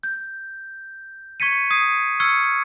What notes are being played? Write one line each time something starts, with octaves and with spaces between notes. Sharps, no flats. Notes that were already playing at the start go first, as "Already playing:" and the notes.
G6
C#6 G#6 B6 C#7 D#7
D#6 G#6 C7 D#7
C#6 E6 F6 G#6 C#7